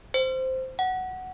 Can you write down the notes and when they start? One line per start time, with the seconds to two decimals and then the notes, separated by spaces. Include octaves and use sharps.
0.14 C5
0.79 F#5